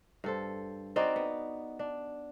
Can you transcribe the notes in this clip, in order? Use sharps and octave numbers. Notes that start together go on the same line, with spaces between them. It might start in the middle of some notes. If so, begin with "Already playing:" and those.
G2 A4 C5
C4 D#4 F#4 D5
B3
D4